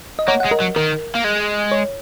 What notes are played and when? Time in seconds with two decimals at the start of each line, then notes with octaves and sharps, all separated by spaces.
0.19 D#5
0.28 A#3 C#5 F#5
0.40 G#3 F#5
0.51 A#4 D#5
0.60 F#3
0.76 D#3 A#4
1.15 A#3
1.24 G#3
1.72 C#5